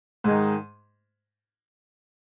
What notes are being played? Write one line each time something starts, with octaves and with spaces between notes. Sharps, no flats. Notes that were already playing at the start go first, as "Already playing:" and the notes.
G#2 D#3 G#3 D#4